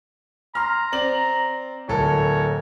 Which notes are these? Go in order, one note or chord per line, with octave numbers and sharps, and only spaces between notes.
A#5 C6 F6
C4 D5 F#7
D1 A4 A#4 C#5